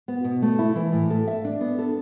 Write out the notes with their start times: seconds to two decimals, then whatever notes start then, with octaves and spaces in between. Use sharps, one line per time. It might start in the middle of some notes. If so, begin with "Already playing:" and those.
0.08 B3
0.24 B2
0.42 A3
0.59 E4
0.76 E3
0.92 A2
1.10 A4
1.28 E5
1.45 D4
1.61 B3
1.79 A4